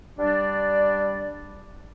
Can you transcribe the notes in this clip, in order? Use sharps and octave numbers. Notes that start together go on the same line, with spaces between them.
G3 D4 D5